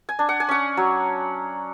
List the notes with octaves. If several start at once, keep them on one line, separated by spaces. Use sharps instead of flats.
G#5
D4
F#5
G#5
C#4 F#5
F#3